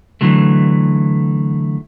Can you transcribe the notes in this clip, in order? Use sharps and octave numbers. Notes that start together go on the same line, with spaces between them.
D3 E3 F#3 A3